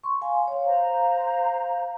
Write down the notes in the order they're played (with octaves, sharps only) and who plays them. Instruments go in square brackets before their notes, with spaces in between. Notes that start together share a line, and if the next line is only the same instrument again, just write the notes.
[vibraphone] C6 C#6
F5 G#5 C6
C#5 F5
[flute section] C5 A#5 [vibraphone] F5